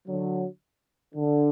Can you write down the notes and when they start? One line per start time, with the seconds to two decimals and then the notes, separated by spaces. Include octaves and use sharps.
0.08 D3 F#3
1.15 D3